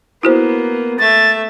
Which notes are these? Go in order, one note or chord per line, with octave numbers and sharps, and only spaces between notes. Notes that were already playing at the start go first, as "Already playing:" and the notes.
A#3 B3 E4 F#4 C5
A3 E5 A6